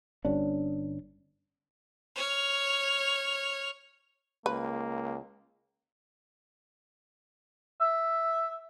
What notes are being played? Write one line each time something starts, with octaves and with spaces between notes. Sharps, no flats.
G1 G2 C#4 D4
C#5 F6
C#2 A#3 B4
E5